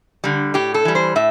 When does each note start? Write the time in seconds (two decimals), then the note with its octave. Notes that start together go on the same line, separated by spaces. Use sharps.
0.24 D3 G3
0.54 A2 G4
0.74 A4
0.85 E3 G3
0.95 C5
1.16 A2 E5